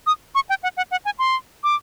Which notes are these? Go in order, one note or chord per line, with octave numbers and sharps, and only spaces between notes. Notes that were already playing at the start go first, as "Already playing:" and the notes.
D#6
C#6
G5
F#5
F#5
F#5
G#5
C6
D6